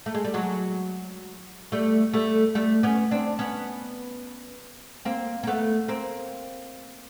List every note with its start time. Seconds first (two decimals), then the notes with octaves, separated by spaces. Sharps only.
0.06 A3
0.14 G#3
0.25 G3
0.34 F#3 G#3
1.72 G3 A3
2.13 G3 A3
2.55 G3 A3
2.83 B3 C#4
3.11 C4 D4
3.39 B3 C#4
5.05 A#3 C4
5.43 A#3
5.47 A3 B3
5.88 A#3 C4